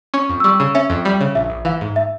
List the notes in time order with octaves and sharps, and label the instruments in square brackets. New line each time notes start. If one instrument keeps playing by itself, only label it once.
[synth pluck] C#4 [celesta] C#6
[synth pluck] F2
[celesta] E6
[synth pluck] G3 [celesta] C#6
[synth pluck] C#3
[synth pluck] C#4 [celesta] E5
[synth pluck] F2
G3
C#3
[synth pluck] A#1 [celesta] E5
[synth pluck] A#1
[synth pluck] E3 [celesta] F5
[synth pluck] G#2
[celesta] E5